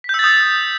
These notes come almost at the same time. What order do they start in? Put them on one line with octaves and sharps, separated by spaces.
B6 G6 E6 A6 D#6